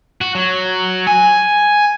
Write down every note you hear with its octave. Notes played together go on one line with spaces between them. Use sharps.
F#4
F#3
G#5